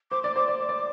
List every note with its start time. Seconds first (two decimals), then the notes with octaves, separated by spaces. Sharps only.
0.11 C5 D6
0.23 D5 D6
0.36 C5 D6
0.48 D5 D6
0.59 D6
0.69 D5